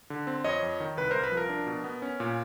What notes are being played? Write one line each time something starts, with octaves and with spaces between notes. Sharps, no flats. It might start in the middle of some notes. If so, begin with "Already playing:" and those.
D3
C4
F2 C#5 D#5
F2
D#3
C2 B4
C2 A#4 C5
B4
F3
A#4
D4
B2
B3
C#4
A#2